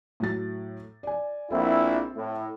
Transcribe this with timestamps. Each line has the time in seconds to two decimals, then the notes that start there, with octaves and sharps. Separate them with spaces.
0.20 A2 F#3 A6
1.03 D5 G#5
1.50 A#1 C4 E4 A4
2.15 A2